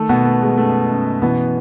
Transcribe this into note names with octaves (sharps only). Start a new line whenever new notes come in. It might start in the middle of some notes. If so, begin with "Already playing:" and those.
Already playing: D#3 A3 A4
B2 B3
D#3 A3
G#3
F#2 A3
F#2
B2 E3 B3